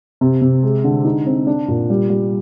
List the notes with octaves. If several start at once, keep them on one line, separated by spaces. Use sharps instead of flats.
C3
C3
G#3
D3
D#4
C4
D4
A#2
G3
G3